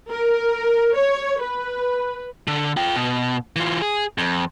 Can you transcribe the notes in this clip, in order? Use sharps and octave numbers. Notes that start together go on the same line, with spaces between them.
A#4
C#5
B4
D3
F4 G5
B2
E3 F4
G#4
F2